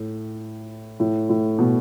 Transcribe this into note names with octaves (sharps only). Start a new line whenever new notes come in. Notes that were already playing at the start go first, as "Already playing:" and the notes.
Already playing: A2
A2
A2
B2